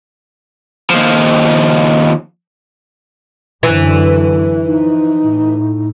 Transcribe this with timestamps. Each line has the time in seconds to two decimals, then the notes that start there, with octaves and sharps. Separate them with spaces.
0.90 D#2 F3
3.63 F#2 D3 E3
4.65 F3 D#4
5.25 A2